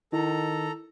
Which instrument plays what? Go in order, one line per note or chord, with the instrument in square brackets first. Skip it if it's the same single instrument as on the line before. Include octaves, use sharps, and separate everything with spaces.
[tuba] D#3 [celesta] E4 [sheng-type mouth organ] A4 A#5